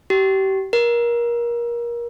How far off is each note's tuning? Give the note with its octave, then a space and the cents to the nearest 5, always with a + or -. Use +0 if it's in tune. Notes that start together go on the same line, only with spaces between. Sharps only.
G4 -30
A#4 +25